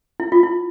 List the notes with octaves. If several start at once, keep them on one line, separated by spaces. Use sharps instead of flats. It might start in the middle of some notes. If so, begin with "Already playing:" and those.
E4
F4
E4